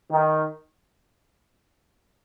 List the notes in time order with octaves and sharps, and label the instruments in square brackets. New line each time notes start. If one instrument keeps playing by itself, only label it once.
[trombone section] D#3